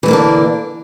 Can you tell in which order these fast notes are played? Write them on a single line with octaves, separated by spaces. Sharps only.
E3 A3 A#3 D3 D4